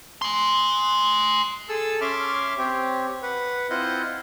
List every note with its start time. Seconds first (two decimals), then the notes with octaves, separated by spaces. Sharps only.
0.22 G#5 C6
1.69 G#4 A4 A5 E6
2.01 C#4 E5 C6 D6 F6
2.58 C4 G4 C#5
3.23 B4 F#5
3.70 C4 E4 F4 C5 D#5 F#5